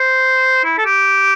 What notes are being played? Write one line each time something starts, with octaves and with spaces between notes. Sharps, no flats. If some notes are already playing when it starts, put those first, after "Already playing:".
Already playing: C5
E4
A4
G4